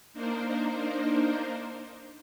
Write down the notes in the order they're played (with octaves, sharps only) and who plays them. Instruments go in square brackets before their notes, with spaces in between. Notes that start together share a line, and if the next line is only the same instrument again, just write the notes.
[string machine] A#3 D4 D#4 A#4 C5